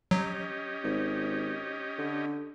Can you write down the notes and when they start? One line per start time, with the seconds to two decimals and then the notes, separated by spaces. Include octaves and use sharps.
0.11 F#3 C#4 G4 D#5
0.84 G#1
1.98 D3